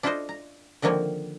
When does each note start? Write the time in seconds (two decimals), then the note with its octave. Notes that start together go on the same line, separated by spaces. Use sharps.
0.03 D4 E4 F4 A4 C5 D#5
0.29 A#5
0.82 D3 D#3 F3 A#3 C4 C#5